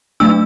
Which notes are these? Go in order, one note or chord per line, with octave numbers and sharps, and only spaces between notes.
F#3 A3 D4 E6